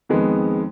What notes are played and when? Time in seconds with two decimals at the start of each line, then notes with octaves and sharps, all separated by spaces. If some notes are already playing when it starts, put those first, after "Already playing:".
0.09 F2 D#3 G#3 B3